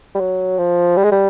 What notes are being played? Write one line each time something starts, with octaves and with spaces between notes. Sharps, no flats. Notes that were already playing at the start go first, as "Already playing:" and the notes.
G3
F#3
F3
G3
G#3
G3